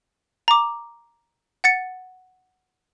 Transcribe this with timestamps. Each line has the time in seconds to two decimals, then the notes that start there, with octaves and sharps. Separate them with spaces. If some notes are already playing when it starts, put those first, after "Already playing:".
0.48 A#5 D6
1.64 F#5 A6 C#7